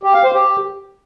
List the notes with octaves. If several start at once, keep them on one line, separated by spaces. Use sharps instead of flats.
G4
F5
C5
G4